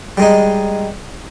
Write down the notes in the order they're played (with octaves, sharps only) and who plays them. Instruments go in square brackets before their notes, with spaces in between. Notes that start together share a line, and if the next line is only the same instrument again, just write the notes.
[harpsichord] G3 G#3 D#4